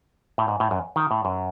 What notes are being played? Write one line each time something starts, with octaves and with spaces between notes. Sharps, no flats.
A2
G#2
A2
F#2
D#3
A2
F#2